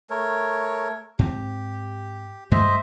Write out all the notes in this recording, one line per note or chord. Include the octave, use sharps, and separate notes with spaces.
A3 A#4 C#5
G#2 C4 G4
G2 G#3 A3 C5 D#5 E5